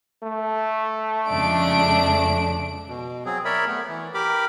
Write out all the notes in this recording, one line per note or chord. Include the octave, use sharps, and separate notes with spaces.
A3
F2 C#3 G#3 D4 D7
B2
F#3 C4 G#4
A#4 C#5 D5 E5 B5
A3 B3
E3
G4 A#4 B5 D6